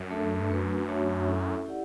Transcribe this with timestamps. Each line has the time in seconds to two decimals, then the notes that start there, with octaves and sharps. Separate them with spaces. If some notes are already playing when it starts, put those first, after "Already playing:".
Already playing: F#2
0.11 A3 D4 A4 E5
0.40 G2
0.50 F#2 A3 D4 F#4 B4
0.88 A3 D4 F#4 C#5 E5
1.27 C#4 E4 A4 E5
1.66 E4 G4 D5 F#5